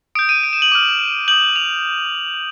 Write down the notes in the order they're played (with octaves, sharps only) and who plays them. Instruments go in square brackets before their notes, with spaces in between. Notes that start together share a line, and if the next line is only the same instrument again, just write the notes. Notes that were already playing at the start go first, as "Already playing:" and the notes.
[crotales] D#6 D7
G6
D#7
D7
E7
F#7
D6 F6
D#6 G6 F#7
F7